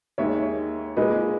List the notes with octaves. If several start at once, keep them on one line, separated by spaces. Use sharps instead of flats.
D#2 D#3 G#3 C#5 E5
A#2 G#3 B4 D#5